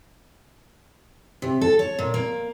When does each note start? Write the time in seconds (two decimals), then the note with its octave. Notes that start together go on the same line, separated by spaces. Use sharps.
1.42 C3
1.61 A4
1.79 C#5
1.99 A#2
2.14 A#3